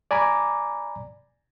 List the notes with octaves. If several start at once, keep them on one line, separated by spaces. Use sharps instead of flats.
D5 G#5 A#5 B5 D6